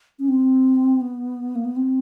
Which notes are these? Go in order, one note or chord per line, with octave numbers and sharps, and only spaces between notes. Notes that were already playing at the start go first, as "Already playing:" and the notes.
C#4
C4
B3
A#3
B3
C4